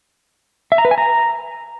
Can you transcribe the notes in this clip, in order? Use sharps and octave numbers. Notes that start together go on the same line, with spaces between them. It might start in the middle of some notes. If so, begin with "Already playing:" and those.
E5
A#5
B4
G#5
A#5